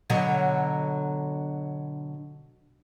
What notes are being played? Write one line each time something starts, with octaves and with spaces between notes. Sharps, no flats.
B2 D3 F#3